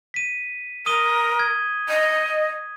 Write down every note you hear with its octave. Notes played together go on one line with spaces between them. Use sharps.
B6 D#7
A#4 D#6 D#7 G7
G#6
D#5